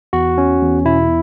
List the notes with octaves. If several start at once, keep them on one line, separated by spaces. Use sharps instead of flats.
E2 F#4
C#4
E2
B2 E4